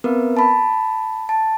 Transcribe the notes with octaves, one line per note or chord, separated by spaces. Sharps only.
B3 C4 A#4 B4
A5 B5
A5